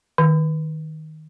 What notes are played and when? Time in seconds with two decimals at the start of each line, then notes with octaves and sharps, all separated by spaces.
0.18 D#3